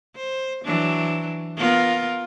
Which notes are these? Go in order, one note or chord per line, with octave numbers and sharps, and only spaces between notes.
C5
E3 F#3 D4
B3 F4 A#4